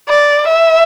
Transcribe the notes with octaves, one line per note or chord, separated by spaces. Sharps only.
D5
E5